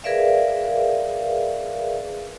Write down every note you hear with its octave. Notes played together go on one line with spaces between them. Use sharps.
G#4 A#4 B4 D5 E5 F5